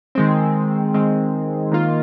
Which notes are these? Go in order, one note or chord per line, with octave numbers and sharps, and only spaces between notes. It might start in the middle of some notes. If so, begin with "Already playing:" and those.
D#3 G#3 C4
D#3 G#3 C4
D#3 A#3 F4